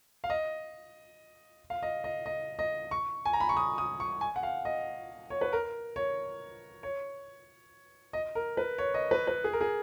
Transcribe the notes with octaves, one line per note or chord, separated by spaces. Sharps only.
F5
D#5
F5
D#5
D#5
D#5
D#5
C#6
G#5
A#5
B5
C#6
D#6
D#6
C#6
G#5
F#5
F5
D#5
C#5
B4
A#4
C#5
C#5
D#5
A#4
B4
C#5
D#5
B4
B4
G#4
A#4
G#4